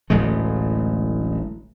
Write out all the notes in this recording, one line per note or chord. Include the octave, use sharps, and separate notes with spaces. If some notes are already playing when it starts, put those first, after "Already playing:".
D1 A1 G#3 A3